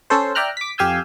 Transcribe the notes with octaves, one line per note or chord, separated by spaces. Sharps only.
C#4 A4 C5
D5 E5 G5 A#5 F6 F#6
D6 B6
F2 G4 F5 G#5 E6 G6